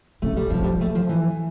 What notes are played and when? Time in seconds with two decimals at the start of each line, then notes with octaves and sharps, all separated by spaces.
0.22 C#3 A3
0.37 G3
0.50 C#3 F3
0.63 G3
0.81 A3
0.95 F3
1.09 E3